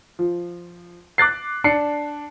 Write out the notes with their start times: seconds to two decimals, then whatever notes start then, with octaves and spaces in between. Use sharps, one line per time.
0.19 F3
1.18 D6 F#6 A6 C7
1.64 D4 A5 C7 C#7